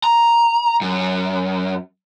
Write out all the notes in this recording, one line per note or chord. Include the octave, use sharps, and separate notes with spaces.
A#5
F#2